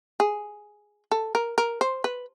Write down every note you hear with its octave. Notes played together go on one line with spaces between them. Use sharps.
G#4
A4
A#4
A#4
C5
B4